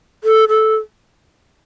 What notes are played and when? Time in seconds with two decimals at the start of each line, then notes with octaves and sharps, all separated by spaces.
0.24 A4
0.49 A4